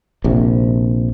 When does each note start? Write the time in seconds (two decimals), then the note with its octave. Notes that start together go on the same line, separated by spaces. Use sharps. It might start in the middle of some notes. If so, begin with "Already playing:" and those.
0.24 A#1 C3